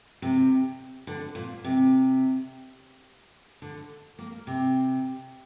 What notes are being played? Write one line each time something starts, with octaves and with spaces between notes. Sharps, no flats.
C3
D3
A#2
C3
D3
A#3
C3